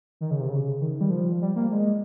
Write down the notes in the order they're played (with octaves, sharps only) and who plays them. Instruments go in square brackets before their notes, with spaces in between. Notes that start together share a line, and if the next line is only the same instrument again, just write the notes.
[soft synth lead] D#3
C#3
C3
C#3
D#3
G3
F3
G3
A#3
G#3